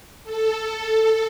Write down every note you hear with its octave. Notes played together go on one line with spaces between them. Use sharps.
A4